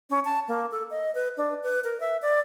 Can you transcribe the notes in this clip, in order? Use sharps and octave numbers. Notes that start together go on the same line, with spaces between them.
C#4
A5
A#3
A4
D#5
B4
D4
B4
A#4
E5
D5